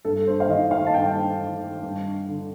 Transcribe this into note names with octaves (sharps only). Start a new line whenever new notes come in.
G2 A4
C5
F5
D#3 D#5
F5
A5
G2 G5
D#3
G2
D3